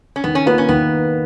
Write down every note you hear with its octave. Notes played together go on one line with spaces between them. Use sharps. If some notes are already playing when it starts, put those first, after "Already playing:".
C#4
D#3 B3
C#4
A#3 B3 F4 B4
C#4
D#3 B3